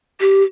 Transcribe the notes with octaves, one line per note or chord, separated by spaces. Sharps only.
G4